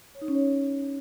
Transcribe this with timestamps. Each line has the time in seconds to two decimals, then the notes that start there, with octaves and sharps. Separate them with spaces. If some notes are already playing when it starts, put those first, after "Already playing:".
0.15 C#5
0.21 D#4
0.28 C#4
0.35 C#5